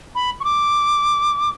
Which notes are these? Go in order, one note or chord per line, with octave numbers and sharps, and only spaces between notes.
B5
C#6
D6